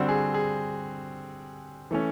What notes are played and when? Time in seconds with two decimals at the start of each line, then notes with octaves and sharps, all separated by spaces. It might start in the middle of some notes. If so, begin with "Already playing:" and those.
Already playing: D3 G3 C4 F#4
0.09 G#4
0.34 G#4
1.91 E3 A3 C#4